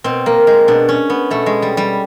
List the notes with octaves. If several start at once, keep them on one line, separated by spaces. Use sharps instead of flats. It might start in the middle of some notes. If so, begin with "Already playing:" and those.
B2 C4
A#3
G#3
B2 D4
C#4
B3
B2 A3
G#3
G3
G3